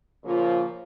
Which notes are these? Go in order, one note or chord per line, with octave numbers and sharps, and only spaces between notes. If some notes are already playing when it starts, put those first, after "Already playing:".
A#2 C#3 F3 A#3 F4